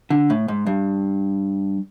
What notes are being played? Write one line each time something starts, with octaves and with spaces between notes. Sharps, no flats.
D3
A2
G#2
G2